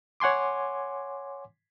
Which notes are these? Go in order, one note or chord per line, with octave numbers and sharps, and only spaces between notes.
C#5 F#5 G#5 C6 D6